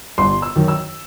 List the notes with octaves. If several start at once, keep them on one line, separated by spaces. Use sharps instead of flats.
G1 C6
E6
F#2 D#3
E6